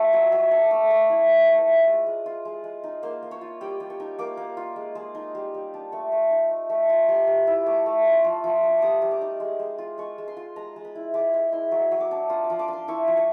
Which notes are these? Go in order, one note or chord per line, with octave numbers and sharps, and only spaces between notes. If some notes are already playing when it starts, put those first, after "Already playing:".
Already playing: A3 F4
F#3 D#5
F#3 E5
D4 F5
A3 E5
A3 D5
E4 C#5
A3 C5
A3
B4
F4
G#3
G#3
F4
G#3
G#3
D#4
A#3 C5
A#3
C#5
F4
G3 G5
G3
C#6
D#4
A#3 D6
A#3
F4
G#3
G#3
D#4
G3
G3
D4
A3 C#6
A3
D#4
A3
A3
F4
G3 C6
G3
E4
A3 D6
A3
F4
F3
F3
D4
G3 D6 D#6
G3
D6
D#4
G#3
G#3
F4
G#3 C#6
G#3
C6
F4
G#3 A#5
G#3
B5
E4
G#3 D6
G#3 C6
E4 C6
F#3
F#3
D6
D4
F4 D#6
D6
F3
D6
D4 C6
E4 C#6
F3
C#6